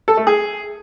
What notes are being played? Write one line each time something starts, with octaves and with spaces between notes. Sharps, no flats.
A4
A3
G#4